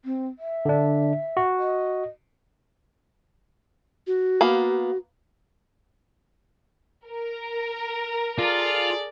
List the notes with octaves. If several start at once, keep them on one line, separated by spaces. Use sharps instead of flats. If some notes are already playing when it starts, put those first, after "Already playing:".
C4
E5
D3 D4
F#4
D#5
F#4
A#3 B3 F5
A#4
F4 G#4 A4 D5